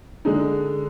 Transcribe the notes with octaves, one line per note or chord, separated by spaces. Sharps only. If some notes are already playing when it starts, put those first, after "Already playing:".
D3 G#3 D#4